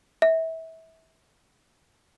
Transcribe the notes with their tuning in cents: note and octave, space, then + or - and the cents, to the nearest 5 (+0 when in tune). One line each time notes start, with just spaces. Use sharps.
E5 -25